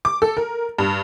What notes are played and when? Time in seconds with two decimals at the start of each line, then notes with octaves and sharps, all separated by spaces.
0.05 D6
0.22 A4
0.37 A#4
0.79 G2